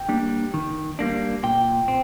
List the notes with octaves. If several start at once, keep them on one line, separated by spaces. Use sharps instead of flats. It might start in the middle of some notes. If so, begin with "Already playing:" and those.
Already playing: G5
G3 A#3 D4
D#3
G3 A#3 D4
A#2 G5
C4